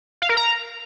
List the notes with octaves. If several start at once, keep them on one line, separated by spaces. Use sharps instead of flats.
F5
A#4
A#5